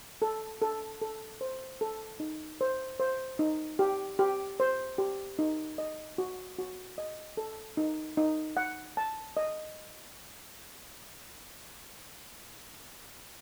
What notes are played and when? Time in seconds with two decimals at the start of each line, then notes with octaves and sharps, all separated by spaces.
0.22 A4
0.61 A4
1.02 A4
1.41 C5
1.81 A4
2.20 D#4
2.61 C5
3.00 C5
3.39 D#4
3.79 G4
4.19 G4
4.60 C5
4.98 G4
5.39 D#4
5.78 D#5
6.18 F#4
6.59 F#4
6.98 D#5
7.37 A4
7.77 D#4
8.17 D#4
8.57 F#5
8.97 A5
9.37 D#5